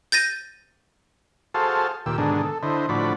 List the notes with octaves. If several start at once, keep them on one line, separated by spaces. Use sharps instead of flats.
G6 A6 A#6 D#7
F#4 G#4 A4 C5 F5 A5
D#2 A#2 G4 E6
G#2 B2 D3 D#3 D4 G#4
A4
D3 E4 C5 D#5
A2 D3 F3 F#4 D5 B5